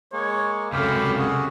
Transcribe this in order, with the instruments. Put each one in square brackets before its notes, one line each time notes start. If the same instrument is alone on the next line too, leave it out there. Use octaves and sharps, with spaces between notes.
[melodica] G#3 A#3 [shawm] C#5
[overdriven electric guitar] C#2 C3 [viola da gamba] F#2 A4 [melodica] G4 G5 B5 [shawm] F5
[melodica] F#4 G#4